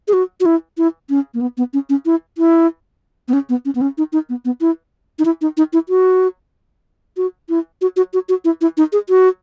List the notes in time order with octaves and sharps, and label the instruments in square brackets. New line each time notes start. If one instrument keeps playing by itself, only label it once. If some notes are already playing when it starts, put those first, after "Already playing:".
[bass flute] G#4
F#4
F#4
E4
E4
C#4
A#3
B3
B3
C#4
C#4
E4
E4
B3
C#4
B3
C#4
B3
C#4
D#4
D#4
B3
B3
E4
D#4
E4
D#4
D#4
E4
F#4
F#4
E4
F#4
F#4
F#4
F#4
E4
E4
D#4
G#4
F#4